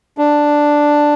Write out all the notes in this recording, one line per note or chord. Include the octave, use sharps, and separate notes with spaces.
D4